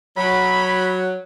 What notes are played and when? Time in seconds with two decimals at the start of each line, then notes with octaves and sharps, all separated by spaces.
0.17 F#3 B5